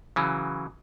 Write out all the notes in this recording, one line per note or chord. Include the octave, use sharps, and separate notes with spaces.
C#3 E3 F#3